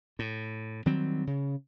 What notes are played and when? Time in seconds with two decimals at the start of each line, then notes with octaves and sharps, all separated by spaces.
0.19 A2
0.86 D#3 F#3 G3 C4
1.27 C#3